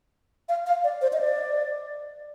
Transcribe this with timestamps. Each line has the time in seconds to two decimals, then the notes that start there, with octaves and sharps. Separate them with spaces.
0.49 F5
0.66 F5
0.84 D5
1.02 C5
1.13 D#5
1.21 D5